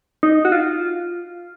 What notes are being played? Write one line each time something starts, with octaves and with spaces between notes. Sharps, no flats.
D#4
F#4
F4